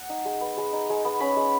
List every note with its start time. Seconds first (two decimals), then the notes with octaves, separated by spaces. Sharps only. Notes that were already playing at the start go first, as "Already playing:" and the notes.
Already playing: F#5
0.09 D#4
0.25 G#3
0.41 B3
0.57 G#3
0.73 D#4
0.90 G#3
1.05 B3
1.20 C#4 B5
1.37 G#3